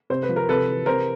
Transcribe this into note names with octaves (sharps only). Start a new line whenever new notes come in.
C3 C5
B4
F3
A#4
C3 A4 B4
E3
C3 A#4 C5